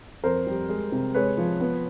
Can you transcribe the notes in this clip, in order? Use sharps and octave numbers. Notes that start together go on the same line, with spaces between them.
F2 A#4 C5
G3
G#3
C3
G#3 B4 C#5
F3
B3